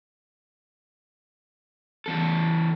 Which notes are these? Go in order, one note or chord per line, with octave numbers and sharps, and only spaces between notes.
E2 A4